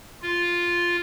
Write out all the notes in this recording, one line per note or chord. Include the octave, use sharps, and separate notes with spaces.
F4